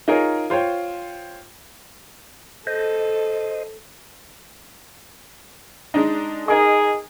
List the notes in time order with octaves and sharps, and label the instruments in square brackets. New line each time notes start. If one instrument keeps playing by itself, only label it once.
[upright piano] D#4 F4 G#4 A#4 C#5
F4 C5 C#5 G5
[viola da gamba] A4 [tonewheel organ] C5 D#5
[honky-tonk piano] G#3 D4 D#4
[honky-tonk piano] D#4 A#4 D#5 [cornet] G#4